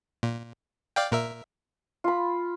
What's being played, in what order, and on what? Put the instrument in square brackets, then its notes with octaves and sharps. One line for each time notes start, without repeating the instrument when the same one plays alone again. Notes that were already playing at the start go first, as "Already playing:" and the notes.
[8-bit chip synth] A#2
D5 F5 G5
A#2 A#4 E5
[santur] F4 B5